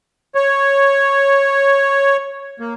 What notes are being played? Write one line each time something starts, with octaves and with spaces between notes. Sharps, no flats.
C#5
A#3